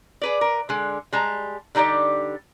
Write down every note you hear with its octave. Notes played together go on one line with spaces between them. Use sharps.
G#4 B4 D5
A#4 B4
D3 G#3
G3 G#3 A5 A#5
D3 G3 D#4 G4 D5